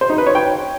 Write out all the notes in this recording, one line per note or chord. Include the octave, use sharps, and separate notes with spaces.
C5
D#4
B4
C#5
G5